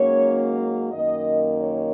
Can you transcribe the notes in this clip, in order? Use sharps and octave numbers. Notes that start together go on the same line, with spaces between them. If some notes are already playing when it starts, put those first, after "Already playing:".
Already playing: G#2 F#3 A#3 C#4 C#5
F#2 D#3 A#3 D#5
C#5